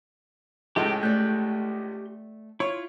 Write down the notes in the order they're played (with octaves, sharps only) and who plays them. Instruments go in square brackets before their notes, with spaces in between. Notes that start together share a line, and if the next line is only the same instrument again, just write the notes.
[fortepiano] C#2 A2 G#3 [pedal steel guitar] G4 A4 G5
[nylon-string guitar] A3 D5 [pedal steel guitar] G4 F#6 G6
[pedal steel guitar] E4 F4 [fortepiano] C#5